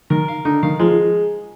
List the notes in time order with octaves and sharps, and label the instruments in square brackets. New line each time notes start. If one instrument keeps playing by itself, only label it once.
[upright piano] D#3 [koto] A#4
[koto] F5
[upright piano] D3 [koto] D#4
[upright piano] D#3 [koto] F5
[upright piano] F3 [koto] G#3